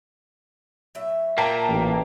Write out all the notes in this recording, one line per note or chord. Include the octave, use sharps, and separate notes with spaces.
A2 F#3 E5
A#2 A#3 G5 A5 A#5
A1